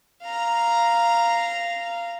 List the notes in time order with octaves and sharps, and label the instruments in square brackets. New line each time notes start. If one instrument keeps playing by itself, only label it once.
[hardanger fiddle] F5 A#5